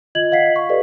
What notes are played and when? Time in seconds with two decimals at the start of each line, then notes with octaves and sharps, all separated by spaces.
0.15 F4 D#5 G#6 F#7
0.32 D#5 F5 F#5 B6 C7
0.56 C#6
0.69 G4 A4 B4 D5 D#5